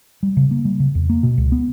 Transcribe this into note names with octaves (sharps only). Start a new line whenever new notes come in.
G3
C#3
A#3
G3
C#3
E2
A#3
B2
C#2
B3